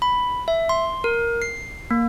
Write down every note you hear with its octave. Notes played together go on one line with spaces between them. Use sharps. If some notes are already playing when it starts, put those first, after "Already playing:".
B5
E5
C6
A#4
C7
A#3